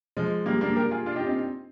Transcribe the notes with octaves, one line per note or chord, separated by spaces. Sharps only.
F3 G#3
G3 A#3
A#3 D4
G4 A#4
F4 G#4
D4 F4
D#4 G4
C4 D#4